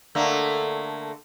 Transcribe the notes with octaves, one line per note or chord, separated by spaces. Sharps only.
D3 A3 A#3